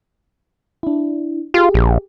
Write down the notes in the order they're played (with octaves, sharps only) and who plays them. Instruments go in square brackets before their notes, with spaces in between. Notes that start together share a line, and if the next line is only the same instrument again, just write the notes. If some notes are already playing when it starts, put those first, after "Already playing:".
[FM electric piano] D4 E4
[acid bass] F4 [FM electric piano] G4 G#4
[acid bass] A#1